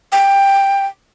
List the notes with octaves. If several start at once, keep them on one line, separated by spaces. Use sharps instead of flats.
G5